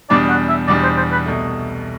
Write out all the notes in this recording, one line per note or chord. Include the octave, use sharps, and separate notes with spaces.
E2 B2 G3 D4 D5
F#5
E5
E2 B2 G3 D4 D5
C5
C5
B4
C2 B2 A3